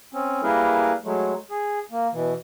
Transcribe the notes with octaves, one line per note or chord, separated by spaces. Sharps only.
C4 C#4
G3 A#3 E4 G#4 A#4 B4
F#3 G#3 A3
G#4
A#3
B2 E3